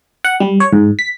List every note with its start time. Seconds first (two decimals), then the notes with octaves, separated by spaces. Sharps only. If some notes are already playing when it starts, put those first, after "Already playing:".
0.24 F#5
0.40 G3
0.60 C#5
0.73 G#2
0.99 B6